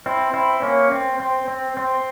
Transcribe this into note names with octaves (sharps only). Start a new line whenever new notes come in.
C4 E4
C4 E4
A#3 C#4
C4
C4
C4
C4